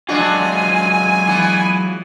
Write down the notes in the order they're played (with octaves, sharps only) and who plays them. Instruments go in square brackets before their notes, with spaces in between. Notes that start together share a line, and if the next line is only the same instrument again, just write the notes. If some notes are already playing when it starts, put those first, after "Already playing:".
[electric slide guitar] F#3 G#3 F4 [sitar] D4 F#4 [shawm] G#5
[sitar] E3 B3